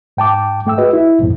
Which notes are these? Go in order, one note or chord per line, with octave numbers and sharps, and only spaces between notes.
G#2 G5 A5 D6
G#2 A3 G5 E6
F#4 G#4 B4 D#5
E4
C2 F2 G#2 B2